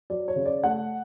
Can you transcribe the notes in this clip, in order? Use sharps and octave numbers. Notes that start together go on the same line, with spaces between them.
F#3 D5
C#5
C#3
D5
A3 F#5